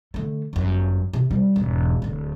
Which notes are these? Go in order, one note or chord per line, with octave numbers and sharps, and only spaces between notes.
D3 A3
G1 F#2
C3
G3 E4
E1 G#2
D1 D3